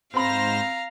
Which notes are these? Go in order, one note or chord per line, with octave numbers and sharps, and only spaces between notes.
G#2 C4 C5 F5 A#5 B5 A#6